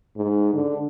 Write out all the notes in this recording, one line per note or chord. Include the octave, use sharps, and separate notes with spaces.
G#2
D3